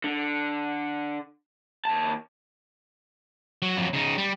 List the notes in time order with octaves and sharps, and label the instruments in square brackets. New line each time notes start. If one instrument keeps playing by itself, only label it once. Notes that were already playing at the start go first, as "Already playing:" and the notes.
[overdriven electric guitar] D3
D#2 A5
[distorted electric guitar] F#3 F#4
F2 F#3
C#3 D#4
G3